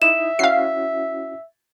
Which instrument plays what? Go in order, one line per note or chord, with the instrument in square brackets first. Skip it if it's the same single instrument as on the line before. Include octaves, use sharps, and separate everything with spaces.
[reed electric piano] D#4 E4 D#6 [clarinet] E5 [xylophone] E7
[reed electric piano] C#4 E4 F#4 [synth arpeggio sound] F5 C7